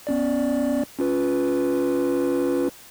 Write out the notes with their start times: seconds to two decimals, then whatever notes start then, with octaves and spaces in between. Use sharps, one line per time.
0.07 B3 C#4 D5
0.99 C#4 F4 B4